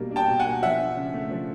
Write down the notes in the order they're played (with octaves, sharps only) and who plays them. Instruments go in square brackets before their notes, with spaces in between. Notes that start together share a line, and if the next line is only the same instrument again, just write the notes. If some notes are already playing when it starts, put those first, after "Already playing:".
Already playing: [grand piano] B2 G3 A#3 D4
D4
[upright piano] G5 A5
[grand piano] B2
[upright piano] F#5 G#5
[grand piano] A#3
[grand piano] F3 [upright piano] E5 F#5
[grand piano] D4
C#3
A3
F3